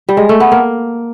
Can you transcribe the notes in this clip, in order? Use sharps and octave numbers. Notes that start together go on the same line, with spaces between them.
G3
G#3
A3
B3
A#3